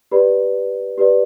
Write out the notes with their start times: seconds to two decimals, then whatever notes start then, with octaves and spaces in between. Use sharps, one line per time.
0.12 G4 B4 D5 B5
0.98 G4 B4 D5